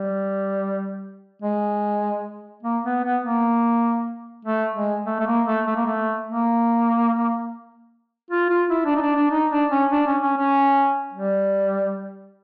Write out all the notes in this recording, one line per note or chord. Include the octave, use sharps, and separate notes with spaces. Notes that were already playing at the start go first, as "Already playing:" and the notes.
Already playing: G3
G#3
A#3
B3
B3
A#3
A3
G#3
A3
A3
A#3
A3
A3
A#3
A3
A#3
F4
F4
E4
D4
D#4
D4
D4
D#4
D4
C#4
D4
C#4
C#4
C#4
G3